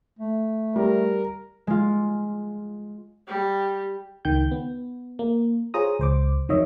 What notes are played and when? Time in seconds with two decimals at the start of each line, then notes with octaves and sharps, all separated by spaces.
0.19 A3
0.76 G3 A#4
1.67 G#3 F4
3.28 G3 G4
4.25 C#2 D#3 G5 G6
4.51 B3
5.19 A#3
5.74 F4 G#4 C5 C#5 A#5 D#6
5.99 C#2 C5 D6
6.49 F2 D#3 F#3 C#5 D#5 E5